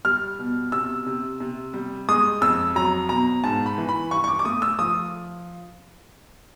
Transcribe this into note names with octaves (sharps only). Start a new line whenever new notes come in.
G3 F6
B2
C3 E6
C3
C3
G3
G#3 D#6
F2 E6
F#3 A#5
B2 A#5
G#2 A5
B5
E3
B5
G2 C#6
C#6
D6
D6
A3 D#6
E6
F3 D#6